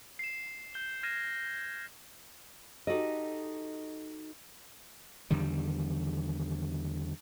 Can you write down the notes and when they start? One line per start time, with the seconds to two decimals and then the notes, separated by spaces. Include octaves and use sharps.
0.19 C7 E7
0.74 G6 G7
1.03 F6 G#6 A#6 D#7 E7
2.87 D#4 F#4 G4 A4 D#5
5.30 E2 D3 D#3 G3